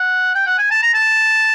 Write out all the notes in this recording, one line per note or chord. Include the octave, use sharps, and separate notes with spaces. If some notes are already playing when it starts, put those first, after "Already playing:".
Already playing: F#5
G5
F#5
G#5
A5
A#5
A5